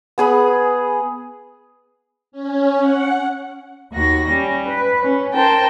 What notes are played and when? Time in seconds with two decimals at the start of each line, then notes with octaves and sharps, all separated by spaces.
0.18 B3 G#4 B5
2.32 C#4
2.80 F#5
3.92 D#2 F#4 A#6
4.28 G3 C#4
4.66 B4
5.01 C#4
5.33 A#4 C5 G5 A5